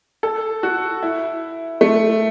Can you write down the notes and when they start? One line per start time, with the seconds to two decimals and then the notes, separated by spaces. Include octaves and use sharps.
0.23 A4
0.63 F#4
1.02 E4
1.81 A3